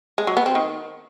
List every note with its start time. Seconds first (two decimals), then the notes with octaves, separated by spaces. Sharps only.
0.18 G#3
0.27 F#3
0.37 B3
0.46 C4
0.55 D#3